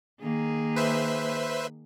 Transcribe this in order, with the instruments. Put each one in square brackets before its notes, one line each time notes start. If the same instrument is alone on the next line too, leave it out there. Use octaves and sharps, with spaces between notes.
[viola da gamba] D#3 A#3 G#4
[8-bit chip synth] B4 C5 E5